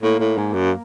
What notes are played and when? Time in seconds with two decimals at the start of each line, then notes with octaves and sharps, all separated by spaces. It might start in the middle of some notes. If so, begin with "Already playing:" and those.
0.02 A2 A#3
0.19 A2
0.37 G#2
0.53 F#2